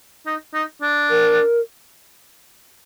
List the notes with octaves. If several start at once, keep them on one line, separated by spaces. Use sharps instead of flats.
D#4
D#4
D4
A#4